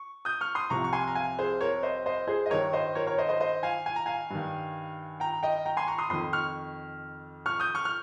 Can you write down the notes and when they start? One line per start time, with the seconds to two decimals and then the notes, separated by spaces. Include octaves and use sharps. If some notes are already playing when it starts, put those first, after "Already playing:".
Already playing: C#6
0.25 D#6 G6
0.41 C#6 F6
0.55 C6 D#6
0.70 C2 C3 F3 A#5 C#6
0.84 C#6
0.93 G#5 C6
1.07 A#5
1.15 F5 G#5
1.39 G#4 C5
1.61 A#4 C#5
1.83 C5 D#5
2.06 C5 D#5
2.27 G#4 C5
2.46 D#5
2.50 G2 D#3 A#4 C#5
2.73 C5 D#5
2.95 A#4 C#5
3.07 A#4 C#5
3.18 C5 D#5
3.29 C5 D#5
3.40 C5 D#5
3.63 F5 G#5
3.86 G#5
3.96 A#5
4.06 F5 G#5
4.30 G2 D#3
5.20 G5 A#5
5.43 D#5 G5
5.65 G5 A#5
5.77 G#5 C6
5.88 A#5 C#6
5.98 C6 D#6
6.10 F2 D#3 C6 D#6
6.33 C#6 F6
7.46 C#6 F6
7.60 D#6 G6
7.75 C#6 F6
7.85 F6